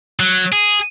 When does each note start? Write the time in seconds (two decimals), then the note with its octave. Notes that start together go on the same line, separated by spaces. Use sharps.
0.20 F#3
0.52 G#4